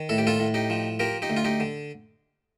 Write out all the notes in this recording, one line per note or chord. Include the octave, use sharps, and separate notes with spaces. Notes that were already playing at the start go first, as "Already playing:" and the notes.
Already playing: D#3
A2 A4
G4
F4 A4
A2
D#4 G4
F3
F3 G4 A#4
D#4 G4
D2
F4
D#4 G4
D3